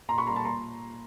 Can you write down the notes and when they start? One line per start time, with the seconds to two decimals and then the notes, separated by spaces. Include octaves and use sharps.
0.09 A#2 A#5 C6
0.18 B5 C#6
0.27 G3 A#3 A#5 C6
0.36 A5 B5
0.45 A#2 A#5 C6